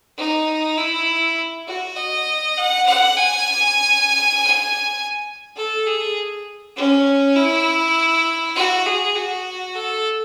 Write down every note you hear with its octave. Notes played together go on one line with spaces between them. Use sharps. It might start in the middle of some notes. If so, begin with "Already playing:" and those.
D#4
E4
F#4
D#5
F#5
F#5
G#5
A4
G#4
C#4
E4
F#4
G#4
F#4
A4